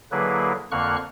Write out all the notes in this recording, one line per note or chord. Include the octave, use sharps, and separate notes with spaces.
D3 F#3 A#3 E4 G#4 B4
F2 D3 A#3 C#6 F6 F#6